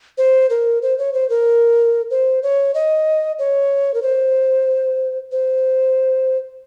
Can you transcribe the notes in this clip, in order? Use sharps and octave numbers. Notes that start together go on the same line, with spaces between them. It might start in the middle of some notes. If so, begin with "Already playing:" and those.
C5
A#4
C5
C#5
C5
A#4
C5
C#5
D#5
C#5
A#4
C5
C5